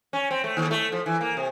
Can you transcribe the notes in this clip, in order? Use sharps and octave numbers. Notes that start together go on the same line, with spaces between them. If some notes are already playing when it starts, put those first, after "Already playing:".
C#4
C4
A3
D#2
A3
F3
E3
A#3
C3